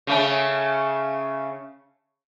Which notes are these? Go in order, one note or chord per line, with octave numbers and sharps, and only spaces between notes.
C#3 A3 C#4